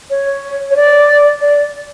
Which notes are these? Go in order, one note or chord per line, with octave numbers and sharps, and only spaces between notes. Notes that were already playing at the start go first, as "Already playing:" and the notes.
C#5
C#5
D5
D5